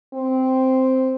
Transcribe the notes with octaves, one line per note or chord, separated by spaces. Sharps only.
C4